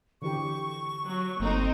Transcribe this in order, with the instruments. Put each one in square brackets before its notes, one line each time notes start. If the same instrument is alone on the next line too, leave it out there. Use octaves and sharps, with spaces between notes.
[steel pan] D3 E3 G4 [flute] C#6
[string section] F#3
[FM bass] G1 [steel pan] A3 A#3 [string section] C4 D#4